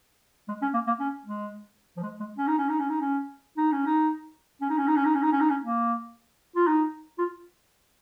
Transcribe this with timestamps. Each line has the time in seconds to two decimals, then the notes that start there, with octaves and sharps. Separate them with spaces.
0.48 G#3
0.62 C#4
0.74 A#3
0.87 A#3
1.00 C#4
1.26 G#3
1.97 F3
2.03 G#3
2.20 G#3
2.38 C#4
2.47 D#4
2.58 C#4
2.69 D#4
2.79 C#4
2.90 D#4
3.00 C#4
3.57 D#4
3.72 C#4
3.86 D#4
4.61 C#4
4.70 D#4
4.78 C#4
4.87 D#4
4.96 C#4
5.05 D#4
5.15 C#4
5.23 D#4
5.32 C#4
5.41 D#4
5.49 C#4
5.63 A#3
6.56 F4
6.67 D#4
7.18 F4